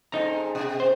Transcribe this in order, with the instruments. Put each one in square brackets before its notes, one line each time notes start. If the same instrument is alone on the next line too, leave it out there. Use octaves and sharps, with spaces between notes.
[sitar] G#2 C3 A4 [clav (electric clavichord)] D#4 A#5
[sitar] B2
[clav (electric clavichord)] C5